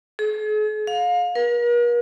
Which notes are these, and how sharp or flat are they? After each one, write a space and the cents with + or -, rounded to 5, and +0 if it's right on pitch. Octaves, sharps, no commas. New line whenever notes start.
G#4 +45
F5 +30
A#4 +45